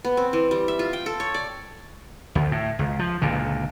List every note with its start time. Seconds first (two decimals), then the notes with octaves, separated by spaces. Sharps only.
0.05 B3
0.17 C4
0.33 E3
0.51 G3
0.68 E5
0.79 F4
0.93 G5
1.06 A4
1.20 C#5
1.34 D5
2.35 D2
2.52 A2
2.79 C#2
2.99 F3
3.22 C#2 A#2 D3